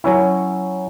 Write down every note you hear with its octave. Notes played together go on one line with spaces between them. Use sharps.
F#3 C#4 E4